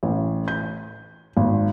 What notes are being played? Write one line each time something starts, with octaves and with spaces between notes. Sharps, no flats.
A1
G6
G#1